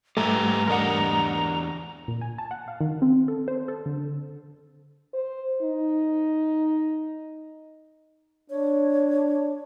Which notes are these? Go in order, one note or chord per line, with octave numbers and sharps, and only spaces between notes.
A#1 G#2 G3 A3 G4 B4 D#5 A#5
E2 D4 G4 A#4 D#5 F#5
A#2
G#5
A5
F#5
F5
D#3
C4
A4
C5
A4
D3
C5
D#4
D4 C#5